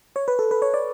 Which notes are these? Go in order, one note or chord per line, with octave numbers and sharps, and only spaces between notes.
C#5
B4
A4
B4
C#5
D5